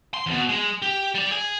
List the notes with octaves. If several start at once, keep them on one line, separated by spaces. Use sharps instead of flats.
C6
E2 B2
G#3
G4
G3 D5
G#4 G#5